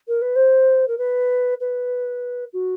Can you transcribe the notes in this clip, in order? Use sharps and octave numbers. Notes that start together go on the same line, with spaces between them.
A#4
B4
C5
A#4
B4
B4
F#4